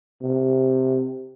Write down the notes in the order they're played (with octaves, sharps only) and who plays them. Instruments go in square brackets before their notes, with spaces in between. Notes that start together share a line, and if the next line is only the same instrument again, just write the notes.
[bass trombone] C3